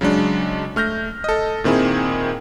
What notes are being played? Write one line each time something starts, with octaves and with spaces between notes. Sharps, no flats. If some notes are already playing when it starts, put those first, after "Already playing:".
C#3 F#3 G#3 D4
A3 F6 G6 A#6
A4 D#5
A#2 D#3 C4 E4 G#4